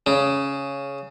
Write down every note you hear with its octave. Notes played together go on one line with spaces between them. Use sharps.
C#3